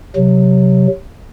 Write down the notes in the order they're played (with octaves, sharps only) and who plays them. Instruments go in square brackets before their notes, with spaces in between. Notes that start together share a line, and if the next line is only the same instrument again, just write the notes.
[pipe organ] C3 F#3